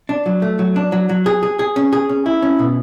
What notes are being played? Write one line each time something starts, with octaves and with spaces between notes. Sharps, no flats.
D4
F#3
A3
F#3
D4
F#3
F#3
G#4
G#4
G#4
C#4
G#4
C#4
E4
C#4
B2